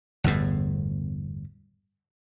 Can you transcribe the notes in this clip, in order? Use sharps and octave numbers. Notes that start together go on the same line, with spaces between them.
G1 E2 A2